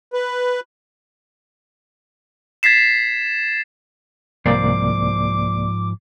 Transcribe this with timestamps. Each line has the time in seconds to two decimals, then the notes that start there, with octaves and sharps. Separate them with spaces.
0.13 B4
2.63 G#6 A6 B6 C7 E7
4.46 C2 G#2 F3 A#3 C5 D5 D6